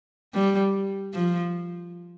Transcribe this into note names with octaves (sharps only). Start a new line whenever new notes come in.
G3
F3